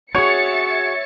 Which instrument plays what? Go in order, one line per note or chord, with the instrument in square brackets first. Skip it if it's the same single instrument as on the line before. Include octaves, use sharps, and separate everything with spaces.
[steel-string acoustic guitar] F#4 G#4 [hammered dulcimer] C#5 [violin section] E5 A6 C#7